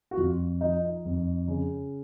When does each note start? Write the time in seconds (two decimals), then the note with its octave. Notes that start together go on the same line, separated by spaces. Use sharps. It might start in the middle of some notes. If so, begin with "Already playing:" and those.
0.11 F#4
0.17 F2 F4
0.61 F3 D#4
0.84 D#4
1.05 F2
1.48 C#3